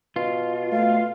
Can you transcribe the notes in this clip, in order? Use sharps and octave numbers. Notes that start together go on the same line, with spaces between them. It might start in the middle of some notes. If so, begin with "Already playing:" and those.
B2 F4
A3 F5